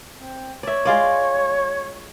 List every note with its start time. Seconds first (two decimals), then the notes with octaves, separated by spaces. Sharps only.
0.14 C4
0.63 C#5 D5 E5
0.85 G#3 F4 D5